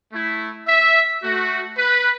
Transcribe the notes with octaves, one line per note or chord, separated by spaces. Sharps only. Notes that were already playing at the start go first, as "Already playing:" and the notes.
A3 E4
E5
A3 F#4
B4